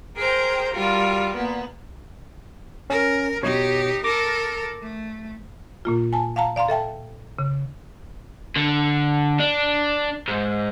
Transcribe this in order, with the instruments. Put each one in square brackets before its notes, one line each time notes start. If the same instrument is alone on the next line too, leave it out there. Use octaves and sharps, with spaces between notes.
[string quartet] G#4 A#4 C5 G5 A#5
G3 F4 F#4 A#4
A#2 B3
[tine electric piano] C#4 [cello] A#4
[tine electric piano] B2 C#5 [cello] D#4 G4
[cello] A4 A#4 [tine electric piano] D6 A#6
[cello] A3
[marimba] A#2 A#3 F4
G#5 A5
F5 F#5 A5 A#5
D5 F5 A#5 C6
A4 E5 G5 A5
C#3
[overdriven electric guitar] D3
D4
G#2